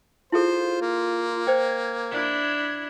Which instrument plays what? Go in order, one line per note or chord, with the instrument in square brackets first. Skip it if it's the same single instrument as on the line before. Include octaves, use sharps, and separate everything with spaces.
[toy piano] E4 G#4 A4 [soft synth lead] F4 [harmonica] C5
[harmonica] A#3
[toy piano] C5 G5 [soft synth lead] G#6
[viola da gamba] D4 E4